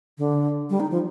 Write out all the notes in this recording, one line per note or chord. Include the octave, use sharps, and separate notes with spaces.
D3
G3
D#4
F3